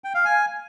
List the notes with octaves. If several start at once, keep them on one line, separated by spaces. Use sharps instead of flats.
G5
F5
G#5